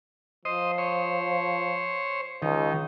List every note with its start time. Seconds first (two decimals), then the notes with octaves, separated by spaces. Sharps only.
0.45 F3 C5 D#5
0.78 C5 C#5
2.42 C#2 D#3